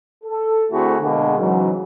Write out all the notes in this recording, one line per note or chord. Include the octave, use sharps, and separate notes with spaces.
A4
D2 A3 C4 E4 F#4 G#4
B2 D3 G#3 A#3 D4 G#4
G#2 C#3 E3 F#3